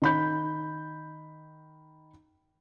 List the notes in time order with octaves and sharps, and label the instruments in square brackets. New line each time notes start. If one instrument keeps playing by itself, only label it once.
[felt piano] D#3 B5 G6